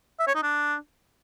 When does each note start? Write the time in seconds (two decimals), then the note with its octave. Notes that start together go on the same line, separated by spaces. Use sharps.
0.19 E5
0.27 C#5
0.35 D#4
0.43 D4